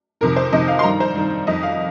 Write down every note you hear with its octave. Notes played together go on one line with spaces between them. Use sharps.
F2 C3 D#3 A#4
C5
F2 C3 D#3 D#5
F5
C6
G2 D#3 A#5
C5
G2 D#3
F2 D#3 D#5
F5